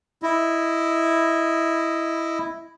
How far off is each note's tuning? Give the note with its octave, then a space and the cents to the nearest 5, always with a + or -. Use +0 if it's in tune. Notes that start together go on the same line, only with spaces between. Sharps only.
E4 +0 D#5 +0